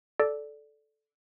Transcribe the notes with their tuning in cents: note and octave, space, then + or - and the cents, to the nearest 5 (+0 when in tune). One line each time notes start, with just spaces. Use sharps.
A4 -10 D5 +0